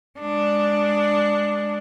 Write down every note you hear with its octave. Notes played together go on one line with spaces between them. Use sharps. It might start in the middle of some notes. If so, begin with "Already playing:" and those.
G#3 D4